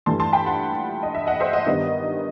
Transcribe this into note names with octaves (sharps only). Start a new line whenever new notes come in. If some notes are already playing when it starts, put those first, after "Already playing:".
G2 E3 A3 A5 C6
A5 C6
G5 B5
F#5 A5
D#5
E5
D#5 F#5
C5 E5
D#5 F#5
G2 D#3 G3 B3 D#5